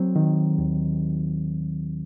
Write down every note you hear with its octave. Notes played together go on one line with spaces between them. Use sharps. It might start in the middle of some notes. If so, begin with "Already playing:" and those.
Already playing: F#3 C4
D#3
D#2